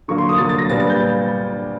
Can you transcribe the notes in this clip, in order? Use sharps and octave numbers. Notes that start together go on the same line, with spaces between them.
D3 F#3 A#3 C#6
C6
D#6
D3 F#3 A#3 A6
A6
A#6
A#2 G3 B3 D4 A6
A6
G6